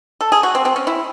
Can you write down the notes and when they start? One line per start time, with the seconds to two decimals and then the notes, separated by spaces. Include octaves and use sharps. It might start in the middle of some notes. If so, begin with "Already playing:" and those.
0.21 A4
0.32 G#4
0.43 F#4
0.55 C4
0.65 C4
0.76 C#4
0.87 E4